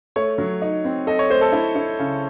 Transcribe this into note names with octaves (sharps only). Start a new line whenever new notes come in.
A3 C#5
F#3
D#4
C4
A4 D#5
C#5
A3 C5
A4
E4
E4
C#3